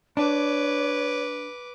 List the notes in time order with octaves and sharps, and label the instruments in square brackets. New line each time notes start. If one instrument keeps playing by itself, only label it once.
[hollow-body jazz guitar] D4 [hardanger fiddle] B4 D6 [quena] C#5